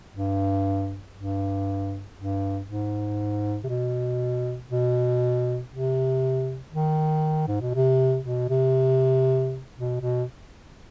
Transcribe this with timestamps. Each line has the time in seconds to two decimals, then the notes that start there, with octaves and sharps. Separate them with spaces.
0.14 G2
1.15 G2
2.16 G2
2.67 G#2
3.64 C3
3.68 B2
4.70 B2
5.71 C3
6.72 D#3
7.47 G#2
7.60 B2
7.74 C3
8.24 B2
8.49 C3
9.77 B2
10.01 B2